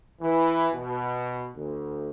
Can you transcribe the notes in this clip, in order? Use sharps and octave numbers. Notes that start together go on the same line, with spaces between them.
E3
B2
D2